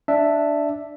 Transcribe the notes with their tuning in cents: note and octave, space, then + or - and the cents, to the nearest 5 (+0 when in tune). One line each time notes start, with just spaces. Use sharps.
D4 +0 E5 +0